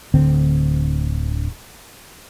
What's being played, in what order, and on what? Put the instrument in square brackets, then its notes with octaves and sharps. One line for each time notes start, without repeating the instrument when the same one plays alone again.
[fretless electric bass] D1 D2 D3 C4